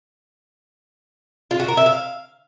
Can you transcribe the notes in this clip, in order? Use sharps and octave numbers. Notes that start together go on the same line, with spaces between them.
F4
F#4
A#4
E5
F5